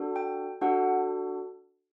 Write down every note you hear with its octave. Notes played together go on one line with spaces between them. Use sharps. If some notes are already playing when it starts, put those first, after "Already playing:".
Already playing: D4 F#4 A4
G5
D4 F#4 A4 F#5